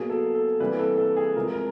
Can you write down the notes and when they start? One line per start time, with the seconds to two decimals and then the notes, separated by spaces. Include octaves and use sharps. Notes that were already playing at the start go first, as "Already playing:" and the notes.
Already playing: B2 F#3 A#3 G#4
0.10 A4
0.35 A4
0.60 C3 E3 G3 A#3 B4
0.79 A4
0.98 A4
1.17 G#4
1.36 C3 F3 G#3 A#4
1.53 A#4